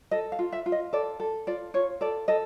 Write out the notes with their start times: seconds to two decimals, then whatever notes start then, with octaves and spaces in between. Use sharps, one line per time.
0.11 A4 D#5
0.32 F5
0.39 F4
0.52 E5
0.66 F4
0.72 D#5
0.93 A4 D5
1.20 A4
1.47 F4 D5
1.74 F4 C#5
2.01 A4 D5
2.28 A4 D#5